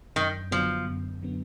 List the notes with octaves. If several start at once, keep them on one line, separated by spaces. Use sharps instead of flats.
F#2 D#3
D3 F3 F#3 B3
F#2
D3 F#3 B3